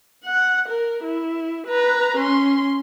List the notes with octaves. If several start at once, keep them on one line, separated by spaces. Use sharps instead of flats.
F#5
A#4
E4
B4 A#5
C#4 C6